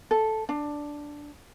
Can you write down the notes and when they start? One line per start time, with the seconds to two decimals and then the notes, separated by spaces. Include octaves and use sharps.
0.11 A4
0.49 D4